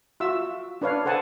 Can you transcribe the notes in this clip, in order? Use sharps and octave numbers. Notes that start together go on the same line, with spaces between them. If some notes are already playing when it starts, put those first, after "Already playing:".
F4 F#4 E5 E6
D4 B4 C#5 F5
A4 C5 F#5 G#5 A5